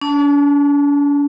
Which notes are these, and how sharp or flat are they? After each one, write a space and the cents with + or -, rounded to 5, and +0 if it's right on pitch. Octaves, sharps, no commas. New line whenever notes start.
D4 -45 A5 +0